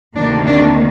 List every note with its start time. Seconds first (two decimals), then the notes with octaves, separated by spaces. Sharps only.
0.16 D2 C3 D#3 A#3 D4
0.47 D4